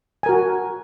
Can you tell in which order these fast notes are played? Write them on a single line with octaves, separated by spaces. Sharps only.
G#5 A#4 F#4